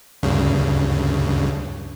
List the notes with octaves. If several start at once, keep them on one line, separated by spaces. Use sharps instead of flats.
D2 G2 C#3